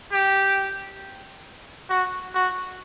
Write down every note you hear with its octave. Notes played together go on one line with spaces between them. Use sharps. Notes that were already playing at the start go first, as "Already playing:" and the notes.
G4
F#4
F#4